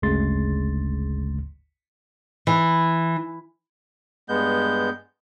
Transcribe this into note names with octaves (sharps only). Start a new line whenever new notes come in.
G1 D2 C#3 G#3 C6 A6
E3
G2 G#3 B3 G6